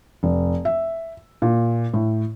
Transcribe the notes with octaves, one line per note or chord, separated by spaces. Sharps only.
F1
E5
A#2
A2